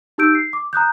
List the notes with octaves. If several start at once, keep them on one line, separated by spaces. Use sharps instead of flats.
D#4 G4 E6 G6 D7
C7
D6
A#5 D#6 F#6 G6